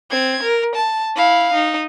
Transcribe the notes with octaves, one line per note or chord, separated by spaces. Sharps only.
C4 G#6
A#4
A5
E4 F5
D#4